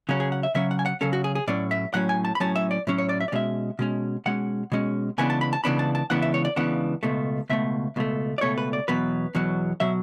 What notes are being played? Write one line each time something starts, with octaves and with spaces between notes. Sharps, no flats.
C#3 F#3 C#4 G#4
G#4
F#5
E5
C#3 F#3 C#4 E5
F#5
G#5
F#5
C#3 F#3 C#4 A4
F#4
G#4
G#4
A2 F#3 C#4 D5
E5
A2 F#3 C#4 F#5
G#5
A5
B5
A2 F#3 C#4 A5
E5
D5
A2 F#3 C#4
C#5
D5
E5
D5
B2 G#3 C#4 E5
B2 G#3 C#4
B2 G#3 C#4 F#5
B2 G#3 C#4
C#2 C#3 E3 B3 D4 G#5
A5
B5
A5
C#2 C#3 E3 B3 D4 B5
A5
A5
C#2 C#3 E3 B3 D4 F#5
E5
C#5
D5
C#2 C#3 E3 B3 D4 F#5
C#2 B2 A3
C#2 B2 A3 E5
C#2 B2 A3
D5
C#2 B2 A3 C#5
B4
D5
E2 B2 F#3 B4
E2 B2 F#3
B2 F#3 E5